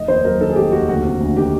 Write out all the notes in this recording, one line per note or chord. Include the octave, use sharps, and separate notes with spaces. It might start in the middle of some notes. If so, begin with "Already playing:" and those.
Already playing: F1 D#5
D#2 C5
F#3 A#4
D#3 A4
G#4
F1 G4
D#2 F#4
D2 F#4
C3
D2
D#3 G4